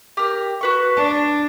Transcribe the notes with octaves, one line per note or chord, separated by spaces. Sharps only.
G4 A#4
F#4 B4 C#6
D4 A5